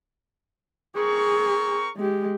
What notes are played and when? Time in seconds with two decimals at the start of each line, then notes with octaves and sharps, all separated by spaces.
0.96 C4 G#4 A#4 C#6
1.96 G#3 G4